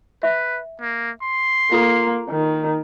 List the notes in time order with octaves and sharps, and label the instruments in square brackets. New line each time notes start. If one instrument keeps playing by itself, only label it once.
[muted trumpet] B4 [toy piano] E5
[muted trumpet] A#3
C6
[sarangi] A#3 [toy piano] F4 A4
[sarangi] D#3